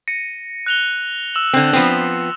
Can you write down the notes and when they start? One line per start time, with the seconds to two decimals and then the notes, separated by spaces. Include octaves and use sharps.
0.08 A#6 C#7 D#7
0.66 F#6 F7 G7
1.34 E6 E7 F#7
1.53 D3 C4
1.73 F3 B3 C4